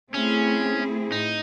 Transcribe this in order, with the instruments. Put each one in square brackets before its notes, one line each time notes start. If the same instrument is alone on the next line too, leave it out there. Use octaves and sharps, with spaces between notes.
[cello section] A3 C4 E4 G#4 [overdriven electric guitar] C#4
[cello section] A2 [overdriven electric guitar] D#4